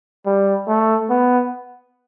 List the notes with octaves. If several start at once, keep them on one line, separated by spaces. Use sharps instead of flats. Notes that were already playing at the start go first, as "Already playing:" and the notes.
G3
A3
B3